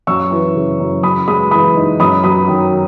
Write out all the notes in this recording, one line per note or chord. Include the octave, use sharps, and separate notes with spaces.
F#2 C#6 E6
E3
C#3
F#2
F#2 B5 D#6
G#3 B5 D#6
E3 B5 D#6
D#4
F#2 B5 D#6
F#3 B5 D#6
D#3